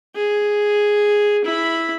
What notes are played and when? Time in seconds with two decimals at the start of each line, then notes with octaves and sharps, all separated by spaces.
0.16 G#4
1.45 E4 B5